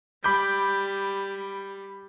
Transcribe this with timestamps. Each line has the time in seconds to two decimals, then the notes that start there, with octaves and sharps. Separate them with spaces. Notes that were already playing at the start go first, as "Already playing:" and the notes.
0.24 G3 B5 D6 G6